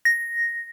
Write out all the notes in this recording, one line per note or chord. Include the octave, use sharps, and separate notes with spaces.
A#6